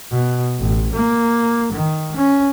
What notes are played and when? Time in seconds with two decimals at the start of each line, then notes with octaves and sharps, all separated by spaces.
0.11 B2
0.59 A1
0.93 A#3
1.72 D#3
2.15 C#4